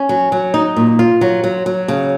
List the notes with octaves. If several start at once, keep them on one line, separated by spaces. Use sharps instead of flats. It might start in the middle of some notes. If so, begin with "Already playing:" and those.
Already playing: C#4
F#3
F#3
D#4
A#2
F4
F#3
F#3
F#3
C#3